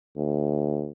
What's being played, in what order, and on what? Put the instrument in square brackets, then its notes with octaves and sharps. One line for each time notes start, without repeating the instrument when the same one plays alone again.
[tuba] D2